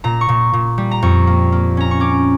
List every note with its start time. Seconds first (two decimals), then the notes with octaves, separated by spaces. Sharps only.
0.04 A#2 A#5
0.21 C#6
0.29 A#2
0.53 A#2
0.78 G3
0.91 A#5
1.02 F2 C#6
1.27 A#3
1.52 A#3
1.77 C#4 A#5
1.91 C#6
2.00 C#4 D6